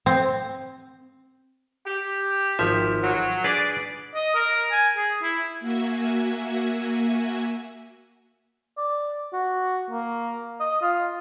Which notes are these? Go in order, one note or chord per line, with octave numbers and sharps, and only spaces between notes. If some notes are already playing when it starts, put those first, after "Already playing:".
C4
G4
G#1 F3 E5
F#3
D4 G#4 B4 D5
D#5
A#4
G#5
G#4
E4
A#3 F#4 E5 G#5
D5
F#4
A#3
D#5
F4